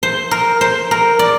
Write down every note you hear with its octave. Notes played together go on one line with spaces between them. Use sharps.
C5
A#4
C5
A#4
D5